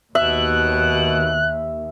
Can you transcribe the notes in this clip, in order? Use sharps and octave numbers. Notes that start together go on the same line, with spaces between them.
D#2 B2 E5 F#6